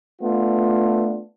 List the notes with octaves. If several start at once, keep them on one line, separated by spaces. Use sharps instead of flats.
A3 B3 D4 F4